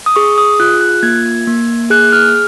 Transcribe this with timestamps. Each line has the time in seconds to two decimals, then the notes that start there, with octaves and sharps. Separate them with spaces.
0.06 D#6
0.16 G#4 C#6
0.38 D#6
0.60 F4 F#6
0.81 F#6
1.03 A#3 G#6
1.47 A#3
1.90 G#4 F#6
2.13 F6